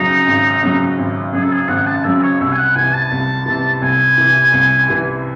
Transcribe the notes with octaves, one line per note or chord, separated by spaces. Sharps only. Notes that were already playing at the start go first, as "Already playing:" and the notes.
Already playing: G#1 F#2 C#3 F#3 D#4
G#1
F#2 C#3 F#3
G#1
F#2 C#3 F#3 G#4
A4
G#4
G#1 F#5
A5
F#2 C#3 F#3 E5
C#5
C2 E5
G#5
F#5
C3 E3 G#5
A5
C2
C3 E3
C2 G#5
C3 E3
C2
C3 E3